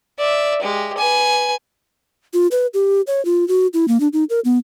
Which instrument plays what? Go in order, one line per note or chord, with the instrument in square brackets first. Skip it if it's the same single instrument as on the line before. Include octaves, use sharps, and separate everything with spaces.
[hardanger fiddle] D5 E5
G#3 G4
B4 G#5
[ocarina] F4
B4
G4
C#5
F4
F#4
E4
A#3
D4
D#4
A#4
B3